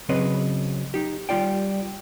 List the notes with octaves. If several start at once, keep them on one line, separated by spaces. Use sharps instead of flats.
C#3 F#3 C4 G#4 B4 D#5
D#4 G4
G3 F4 D5 G5